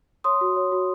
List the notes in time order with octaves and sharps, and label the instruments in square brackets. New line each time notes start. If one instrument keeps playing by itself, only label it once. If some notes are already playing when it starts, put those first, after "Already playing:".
[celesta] C#5 C6 D#6
F#4
C#5
F#4